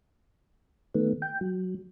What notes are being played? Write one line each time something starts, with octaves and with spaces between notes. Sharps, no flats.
D#3 A3 B3
G5
F#3